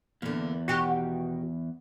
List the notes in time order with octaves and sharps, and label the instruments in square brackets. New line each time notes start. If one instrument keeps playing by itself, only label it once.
[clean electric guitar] E2 [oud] D3 A#3
[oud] B2 D#3 G4 [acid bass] F#4